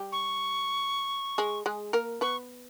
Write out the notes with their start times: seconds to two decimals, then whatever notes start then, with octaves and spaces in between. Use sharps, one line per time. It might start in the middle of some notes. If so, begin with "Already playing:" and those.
Already playing: G3 G4
0.12 C#6
1.38 G#3 G#4
1.66 G#3 G#4
1.93 A#3 A#4
2.21 B3 B4 C#6